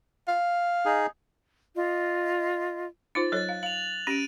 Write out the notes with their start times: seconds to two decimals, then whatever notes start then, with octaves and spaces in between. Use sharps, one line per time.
0.28 F5
0.85 D#4 G#4
1.75 F4 D#5
3.15 D#4 F4 C5 A6
3.32 F#3 A4 C#5 F#6 A6
3.49 F5
3.63 F5 F7 F#7
4.07 C#4 G4 D7 D#7